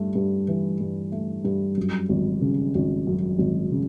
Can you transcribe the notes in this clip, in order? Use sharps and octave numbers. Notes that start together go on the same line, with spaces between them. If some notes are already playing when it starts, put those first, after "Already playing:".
Already playing: G2 A3
G2
E3
G2
A3
G2
F#2
G#1
C#3
G#1
F#2
G#1
C#3